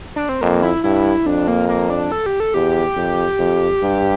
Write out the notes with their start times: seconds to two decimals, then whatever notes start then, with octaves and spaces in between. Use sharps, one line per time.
0.16 D4
0.29 C4
0.41 F2 A#3
0.62 E4
0.84 G2 E4
1.26 F2 D4
1.48 A#3
1.69 A#3
1.90 D4
2.12 A4
2.26 G4
2.40 A4
2.54 E2 G4
2.96 F2
3.39 F2
3.82 G2